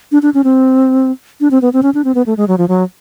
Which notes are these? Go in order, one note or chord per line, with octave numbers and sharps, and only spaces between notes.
D4
D4
C#4
C4
D4
C4
B3
C4
C#4
D4
C4
B3
A3
G#3
F#3
F3
F#3